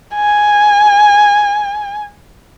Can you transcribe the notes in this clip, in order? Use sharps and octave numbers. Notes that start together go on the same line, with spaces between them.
G#5